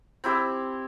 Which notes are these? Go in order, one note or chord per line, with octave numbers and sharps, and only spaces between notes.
C4 E4 G4 C5